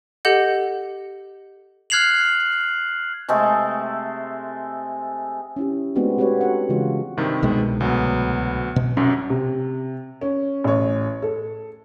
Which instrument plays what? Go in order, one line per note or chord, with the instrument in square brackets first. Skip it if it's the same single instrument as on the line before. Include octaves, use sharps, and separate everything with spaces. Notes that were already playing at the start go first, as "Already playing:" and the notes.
[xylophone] G4 A4 D#5 F#5 G6
[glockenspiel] F6 F#6 G#6 C7 F7 F#7
[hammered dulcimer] C3 G#3 A3 A4
[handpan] C#4 E4 G4
G#3 A3 B3 C4 D4 F#4
G#3 C4 F#4 G4 B4 C#5
F#4 A4 F#5
C#3 E3 G#3 F4 F#4
[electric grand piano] G2 C3 D#3
[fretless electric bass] C2 B2 G#3
[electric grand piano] D2 F#3 B3
[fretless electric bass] B2
[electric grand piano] C2 F#2 [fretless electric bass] C#4
[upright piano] C3
C#4
A1 C#5
A4